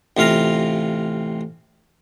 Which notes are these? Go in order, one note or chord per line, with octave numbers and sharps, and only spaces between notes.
A1 C3 F4 F5 A#5